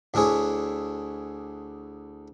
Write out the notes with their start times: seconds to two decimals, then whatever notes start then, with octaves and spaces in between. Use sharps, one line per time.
0.14 D2 D4 E4 G#4 C#5